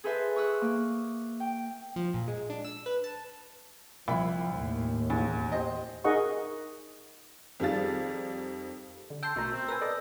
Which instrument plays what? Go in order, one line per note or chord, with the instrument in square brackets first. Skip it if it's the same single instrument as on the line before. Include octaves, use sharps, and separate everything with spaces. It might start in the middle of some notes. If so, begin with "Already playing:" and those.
[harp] G#4 A4 B4 C5 E5
C#6 D#6 E6 F#6
A#3
G5
[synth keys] F3
A#2
G#3
D4
E6
B4
A5
[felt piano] C2 E4 B5 [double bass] F3
[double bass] D#2 A2
[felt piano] B1 E2
G4 C5 D#5
[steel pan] D#4 G#4 A#4 D#5 F#5 C#6
[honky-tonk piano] F2 D#3 G3 G#4 F5 A6
[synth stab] D3
[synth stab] G5 A5 C6 [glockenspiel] E6 G6
[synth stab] A#1 B2 A#4 [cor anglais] A3
[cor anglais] C4
[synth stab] A#4 B4 G#5 [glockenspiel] E6
[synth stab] A4 B4 D5 [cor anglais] D#5